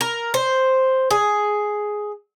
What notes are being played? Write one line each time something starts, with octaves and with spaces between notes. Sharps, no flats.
A#4
C5
G#4